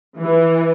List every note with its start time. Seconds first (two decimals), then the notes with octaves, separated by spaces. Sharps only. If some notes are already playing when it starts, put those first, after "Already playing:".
0.18 E3